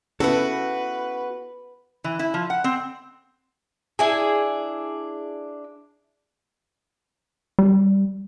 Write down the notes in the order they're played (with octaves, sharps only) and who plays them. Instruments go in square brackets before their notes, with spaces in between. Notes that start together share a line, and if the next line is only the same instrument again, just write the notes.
[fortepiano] C#3 [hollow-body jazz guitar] B3 E4 A4 [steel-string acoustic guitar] F#4 [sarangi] B4
[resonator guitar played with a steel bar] E3
E4
F3
F#5
C4
[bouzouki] D4 E4 G#4
[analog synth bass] G3